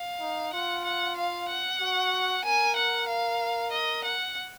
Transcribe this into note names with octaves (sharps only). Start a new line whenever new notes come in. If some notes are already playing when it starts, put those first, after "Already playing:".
Already playing: F5
D#4
F4 F#5
F#5
F5
F#5
F#4
A#4 G#5
F#5
F5
D#5
F#5